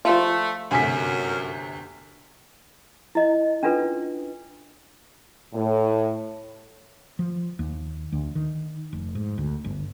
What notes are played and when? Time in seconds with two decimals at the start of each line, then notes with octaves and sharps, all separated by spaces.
0.05 F3 A3 F4
0.71 G1 F#2 C3 A3 G#5 B6
3.15 E4 D#5
3.63 C#4 D4 F4 A4 B4
5.54 A2
7.19 F3
7.59 D#2
8.12 D2
8.35 D#3
8.93 F1
9.15 G#2
9.38 D2
9.64 G1